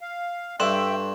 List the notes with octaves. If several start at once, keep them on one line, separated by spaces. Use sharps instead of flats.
F5
G2 A3 D4 E5 G5 C6 E7